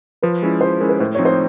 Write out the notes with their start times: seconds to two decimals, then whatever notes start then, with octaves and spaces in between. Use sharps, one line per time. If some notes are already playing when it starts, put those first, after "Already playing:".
0.22 F3 B4
0.42 G#3 C#4 E4
0.61 F3 C5
0.79 G#3 C#4 E4 A#4
0.89 B4
1.00 A2 C5
1.15 F3 A3 C4 D#4 C#5
1.25 C5